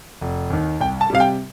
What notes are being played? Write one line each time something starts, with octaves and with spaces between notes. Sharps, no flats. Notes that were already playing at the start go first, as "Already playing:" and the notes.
F1
D#2 D#3
C2 G5
A5
C3 G3 F5
G5